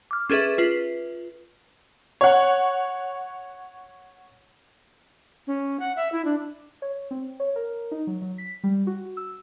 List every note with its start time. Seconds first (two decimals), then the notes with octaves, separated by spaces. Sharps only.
0.11 D6 F6
0.30 C#4 G#4 A4 B4 E5
0.58 F4 B4
2.21 C#5 F#5
5.47 C#4
5.80 F#5
5.96 E5
6.12 E4
6.25 D4
6.82 C#5
7.11 C4
7.40 C#5
7.56 A#4
7.91 D#4
8.07 F#3
8.22 F#3
8.38 B6
8.64 G3
8.87 F#4
9.17 E6